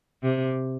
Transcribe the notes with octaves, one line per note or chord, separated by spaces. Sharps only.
C3